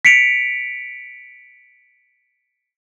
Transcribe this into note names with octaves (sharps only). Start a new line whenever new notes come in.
B6 C#7 D7 F7